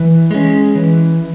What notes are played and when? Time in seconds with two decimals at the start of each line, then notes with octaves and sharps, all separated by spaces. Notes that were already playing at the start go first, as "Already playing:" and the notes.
Already playing: E3
0.31 G#3 C#4
0.75 E3